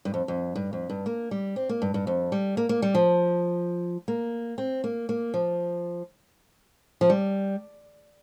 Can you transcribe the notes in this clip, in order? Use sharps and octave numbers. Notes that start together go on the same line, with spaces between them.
G2
F2
F2
G2
F2
G2
A#3
G3
C4
A#3
G2
G2
F2
G3
A#3
A#3
G3
F3
A#3
C4
A#3
A#3
F3
F3
G3